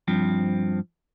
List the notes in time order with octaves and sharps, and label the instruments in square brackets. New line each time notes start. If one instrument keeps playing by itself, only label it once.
[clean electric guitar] G2 F3 C4